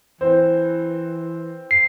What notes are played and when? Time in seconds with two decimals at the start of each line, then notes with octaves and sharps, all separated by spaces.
0.21 E3 C4 C5
1.71 C7